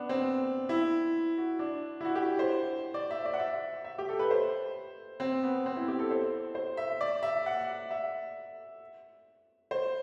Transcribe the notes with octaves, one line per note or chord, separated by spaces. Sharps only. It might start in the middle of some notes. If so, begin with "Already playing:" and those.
Already playing: B3 D4
C4
E4
F#4
D4
E4
F#4
G4
C5
D5
E5
D5
F#5
E5
E5
G4
A4
B4
C5
C4
B3
C4
E4
G4
A4
C5
C5
E5
D5
E5
F#5
E5
C5